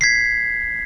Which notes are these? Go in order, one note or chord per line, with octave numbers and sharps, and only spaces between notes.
G#6 B6 C7